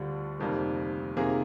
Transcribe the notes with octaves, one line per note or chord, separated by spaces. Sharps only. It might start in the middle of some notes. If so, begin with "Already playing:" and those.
Already playing: D2 D3 G3 D4 F4
F1 F2 D#3 G3 A#3
C3 D#3 A#3 F4 G#4